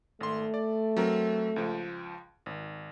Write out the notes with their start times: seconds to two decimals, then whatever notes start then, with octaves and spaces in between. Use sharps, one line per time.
0.21 G#1 A3 C6
0.54 D5
0.97 F#3 C4 A#4
1.56 C#2 F3
2.46 G#1